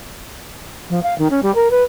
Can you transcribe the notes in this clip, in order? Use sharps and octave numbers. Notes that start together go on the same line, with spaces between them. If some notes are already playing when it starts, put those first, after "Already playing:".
F3
F5
D#3
C#4
G3
A#4
B4